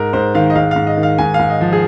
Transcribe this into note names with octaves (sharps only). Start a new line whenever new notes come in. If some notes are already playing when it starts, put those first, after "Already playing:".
Already playing: G#2 A#4
G#2 C5
D#3 F5
D#5
G#2 F5
G#2 F5
D#5
D#3
F5
G#2 G#5
F5
G#2
D#5
F3
G#4